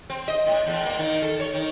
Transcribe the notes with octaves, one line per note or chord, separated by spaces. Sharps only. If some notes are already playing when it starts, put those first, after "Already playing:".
C4
D#5
A2
E2
A#3
D#3
A4
C#5
D#3